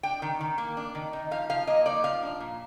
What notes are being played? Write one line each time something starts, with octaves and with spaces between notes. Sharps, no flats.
D4 G5
D#3
D#3
A#3
D4
D#3
D#4
F3 F5
F3 F5
A#3 D#5
D#4 D5
F3 F5
D4
A#2